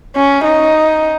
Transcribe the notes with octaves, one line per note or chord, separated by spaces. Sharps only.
C#4
D#4